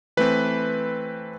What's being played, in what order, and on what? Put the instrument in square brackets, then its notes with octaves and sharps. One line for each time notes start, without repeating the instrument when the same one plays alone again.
[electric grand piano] E3 A3 C4 B4